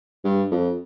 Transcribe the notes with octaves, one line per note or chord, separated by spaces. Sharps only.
G2
F2